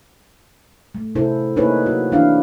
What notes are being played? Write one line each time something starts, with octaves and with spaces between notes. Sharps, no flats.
A3
C3 E4 G#4 A4 C5
A#3 D#4 E4 G#4 B4 C#5
F#4
E3 C4 D4 E4 F5